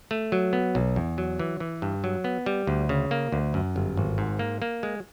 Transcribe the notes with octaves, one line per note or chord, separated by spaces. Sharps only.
A3
F#3
B3
B1
E2
F#3
E3
E3
G2
F#3
B3
G3
D2
C#3
A#3
D2
F#2
G1
G#1
G#2
A#3
A#3
G#3